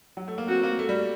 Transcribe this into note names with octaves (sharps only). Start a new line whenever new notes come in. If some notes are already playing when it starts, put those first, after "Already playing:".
F#3
A3
A#3
C4 F#4
A#3
A3
G3